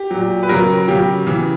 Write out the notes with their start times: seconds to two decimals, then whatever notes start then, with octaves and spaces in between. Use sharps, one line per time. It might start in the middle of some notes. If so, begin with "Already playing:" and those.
Already playing: G4
0.11 A#2 F#3
0.43 B4
0.49 C#3 F#3 A#4
0.88 C#3 F#3 G4
1.27 C#3 E3